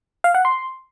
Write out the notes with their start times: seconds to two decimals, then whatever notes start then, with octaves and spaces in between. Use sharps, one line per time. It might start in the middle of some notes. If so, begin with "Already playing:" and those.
0.24 F5
0.35 F#5
0.45 C6